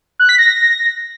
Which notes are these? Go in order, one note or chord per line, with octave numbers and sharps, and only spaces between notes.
F#6
B6
A#6